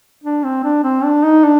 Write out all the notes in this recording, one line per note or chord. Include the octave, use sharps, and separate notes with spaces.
D4
C4
D4
C4
D4
D#4
D4